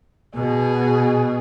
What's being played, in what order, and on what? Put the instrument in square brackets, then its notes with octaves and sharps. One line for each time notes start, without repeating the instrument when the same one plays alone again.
[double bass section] B2 [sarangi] G#4